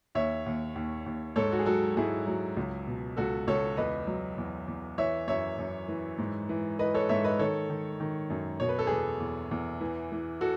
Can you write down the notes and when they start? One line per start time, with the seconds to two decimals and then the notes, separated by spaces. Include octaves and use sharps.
0.15 D#2 C#5 E5
0.46 D#2
0.76 D#2
1.06 D#2
1.36 G#2 A4 C#5
1.52 F#4
1.59 G#4
1.66 F#3 F#4 A4
1.97 G#2 E4 G#4
2.27 F#3
2.57 C#2
2.87 B2
3.17 C#2 F#4 A4
3.47 C#2 A4 C#5
3.77 E2 B4 D#5
4.07 F#3
4.38 E2
4.68 E2
4.98 E3 C#5 E5
5.28 F#2 C#5 E5
5.59 F#2
5.88 E3
6.18 G#2
6.49 E3
6.79 E3 B4 D#5
6.94 A4 C#5
7.09 G#2 C#5 E5
7.24 B4 D#5
7.39 D#3 A4 C#5
7.70 D#3
8.00 D#3
8.30 F#2
8.60 B2 C#5
8.69 B4
8.79 A4
8.87 E2 G#4 B4
9.20 E2
9.51 E2
9.80 E3
10.12 E3
10.41 F#4 A4